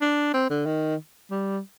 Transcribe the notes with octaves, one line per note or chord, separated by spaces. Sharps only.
D4
C4
D3
D#3
G3